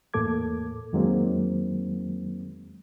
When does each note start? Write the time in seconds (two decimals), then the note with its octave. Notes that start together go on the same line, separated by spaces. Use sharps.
0.14 E2 A2 A#3 A4 D6 G#6
0.93 F2 D#3 F#3 G#3 A#3 C4